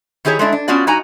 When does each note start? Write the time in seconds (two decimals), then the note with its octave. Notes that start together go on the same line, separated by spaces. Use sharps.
0.25 D#3 E4 G4 G#4 C#5
0.39 G#3 A3 D4 E4
0.53 D4
0.68 B3 C#4 F4 F#4 D5
0.87 G2 D#4 F#4 G#5 A#5